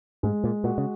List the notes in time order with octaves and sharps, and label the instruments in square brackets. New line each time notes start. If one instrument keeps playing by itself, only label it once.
[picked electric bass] G#2 [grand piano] G#3
[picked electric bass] A#2
[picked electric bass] A#2 [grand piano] F#4
[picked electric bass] C#3